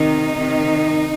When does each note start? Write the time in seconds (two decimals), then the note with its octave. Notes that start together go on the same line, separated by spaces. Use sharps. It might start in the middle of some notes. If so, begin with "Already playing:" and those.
Already playing: C3 D#3 D#4
0.37 C3 D#3